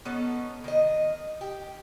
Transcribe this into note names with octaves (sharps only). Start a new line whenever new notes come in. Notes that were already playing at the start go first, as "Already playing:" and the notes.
B3 C#4 D#4 A4
D#3 D#5
G4